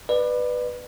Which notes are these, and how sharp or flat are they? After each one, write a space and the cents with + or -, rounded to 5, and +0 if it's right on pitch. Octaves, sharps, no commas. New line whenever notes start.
B4 +0 D5 +30